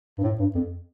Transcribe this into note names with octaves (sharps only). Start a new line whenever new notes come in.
G2
A2
G2
F2